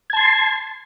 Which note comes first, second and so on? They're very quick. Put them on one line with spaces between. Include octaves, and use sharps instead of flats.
G#6 A5 C6